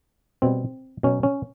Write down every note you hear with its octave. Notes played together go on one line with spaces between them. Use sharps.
B2 G3 C4
B2 F#3 C#4
C#4